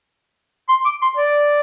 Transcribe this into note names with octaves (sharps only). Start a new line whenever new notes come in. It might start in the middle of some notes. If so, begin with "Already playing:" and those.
C6
D6
C6
D5